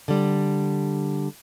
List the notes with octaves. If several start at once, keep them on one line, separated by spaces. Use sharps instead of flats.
D3 G3